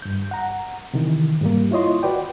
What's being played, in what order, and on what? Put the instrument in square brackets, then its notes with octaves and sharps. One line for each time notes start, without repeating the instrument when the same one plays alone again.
[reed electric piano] G2 G6
F#5 A#5
C3 D#3 E3
G#2 G3 A#3
E4 F4 C#5 D#5 C6
F#4 B4 D5 G5